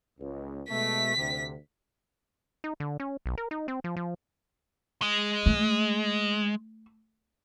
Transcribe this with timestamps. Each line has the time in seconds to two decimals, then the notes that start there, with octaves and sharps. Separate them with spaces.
0.19 C#2
0.69 B2 G#3 A3 B6
1.16 D2 C3
2.64 D#4
2.80 D3
3.00 C#4
3.26 B1
3.38 A#4
3.51 D#4
3.68 C4
3.84 F3
3.96 F3
5.02 G#3
5.46 A3